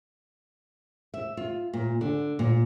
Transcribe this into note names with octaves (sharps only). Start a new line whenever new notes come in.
E5
F4
A#2
D3
A#2